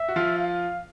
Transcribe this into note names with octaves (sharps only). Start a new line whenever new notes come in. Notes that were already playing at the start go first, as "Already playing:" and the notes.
Already playing: E5
F#4
F3 F4
F5